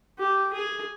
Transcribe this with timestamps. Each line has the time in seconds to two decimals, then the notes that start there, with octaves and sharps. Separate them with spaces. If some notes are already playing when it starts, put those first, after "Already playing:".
0.19 G4
0.53 G#4